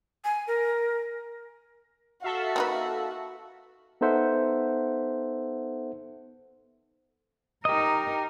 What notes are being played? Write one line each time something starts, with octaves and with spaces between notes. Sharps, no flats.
G#5
A#4
F#4 A4 E5 F5
A#3 D#4 B4
B3 D#4 A4 C5 E5 F#5
D#4 G4 A#4 D#5